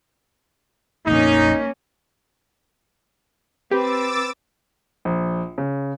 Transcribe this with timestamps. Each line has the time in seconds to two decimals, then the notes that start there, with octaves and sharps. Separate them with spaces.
1.07 A#1 F2 A#3 C#4 D#4
3.71 C4 G4 B4 D6 E6 A6
5.05 A#1
5.58 C#3